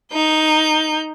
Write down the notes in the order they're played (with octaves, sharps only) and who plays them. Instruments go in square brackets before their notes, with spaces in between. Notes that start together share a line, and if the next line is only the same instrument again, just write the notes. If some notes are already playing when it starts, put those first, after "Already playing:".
[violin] D#4 G6